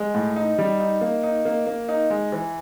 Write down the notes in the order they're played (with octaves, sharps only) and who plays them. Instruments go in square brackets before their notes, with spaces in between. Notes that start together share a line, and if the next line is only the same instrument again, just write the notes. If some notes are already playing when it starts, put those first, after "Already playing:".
Already playing: [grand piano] G#3
A2
D#4
G3
D#4
A#3
D#4
A#3
A#3
D#4
G#3
E3